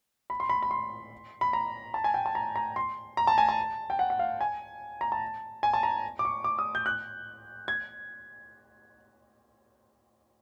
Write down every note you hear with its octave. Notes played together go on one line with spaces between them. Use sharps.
B5
C6
B5
B5
C6
B5
A#5
A5
G#5
G5
A5
A#5
A#5
C6
A#5
A5
G#5
A5
G5
F#5
F#5
F5
G#5
A#5
A5
G#5
A5
A#5
D6
C#6
D6
D#6
G6
F#6
G#6